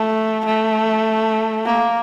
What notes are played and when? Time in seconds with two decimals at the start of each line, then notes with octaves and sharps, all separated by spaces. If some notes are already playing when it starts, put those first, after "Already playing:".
Already playing: A3
0.45 A3
1.65 A#3